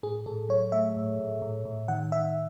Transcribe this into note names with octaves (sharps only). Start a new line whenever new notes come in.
A2 G#4
A2 A4
F#3 C#5
A3 E5
A2
A2
A2
A2
D#3 F#5
D#3 E5